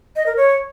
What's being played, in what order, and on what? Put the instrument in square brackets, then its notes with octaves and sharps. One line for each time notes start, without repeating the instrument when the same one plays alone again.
[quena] D#5
A#4
C#5